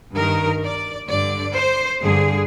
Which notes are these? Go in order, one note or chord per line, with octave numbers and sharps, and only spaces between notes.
G2 D#3 A#4
D5
G2 D3 D5
C5
G2 D3 G#4